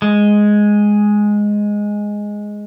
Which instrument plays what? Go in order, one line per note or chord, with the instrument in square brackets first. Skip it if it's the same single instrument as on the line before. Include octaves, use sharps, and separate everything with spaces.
[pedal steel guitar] G#3